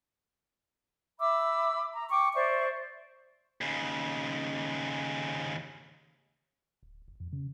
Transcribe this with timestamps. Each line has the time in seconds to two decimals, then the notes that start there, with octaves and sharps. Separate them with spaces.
1.19 E5 B5 D6 E6
1.93 A#5
2.10 G5 C#6 D6
2.34 C5 D5 E5 C#6
3.61 D#2 C#3
6.83 D1
7.08 F1
7.20 F2
7.32 C#3